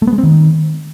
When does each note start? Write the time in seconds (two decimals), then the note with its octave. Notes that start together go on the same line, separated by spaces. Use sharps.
0.02 A3
0.07 B3
0.13 G#3
0.18 C4
0.23 D#3